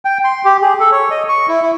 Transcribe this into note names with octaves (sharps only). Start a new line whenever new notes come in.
G5
C6
G4
G#4
A4
C#5
D#5
C#6
E4
E4